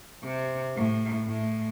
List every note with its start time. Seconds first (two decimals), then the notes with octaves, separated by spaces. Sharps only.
0.24 C3
0.75 A2
1.27 A2